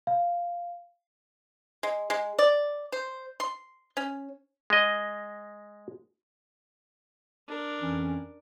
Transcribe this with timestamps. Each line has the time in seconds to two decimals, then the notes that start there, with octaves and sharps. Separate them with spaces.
0.07 F5
1.83 G#3
2.10 G#3
2.39 D5
2.92 C5
3.40 C6
3.97 C#4
4.70 G#3 D#5
7.48 D4 A#4
7.80 F2 E3 C#4